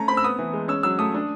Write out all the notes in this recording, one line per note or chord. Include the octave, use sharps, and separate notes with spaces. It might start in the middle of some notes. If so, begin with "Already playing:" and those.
Already playing: A3 C#4 A#5
C4 B5
E6
B3 D#6
E3
G#3
C#4 E6
F#3 E6
A3 D#6
D4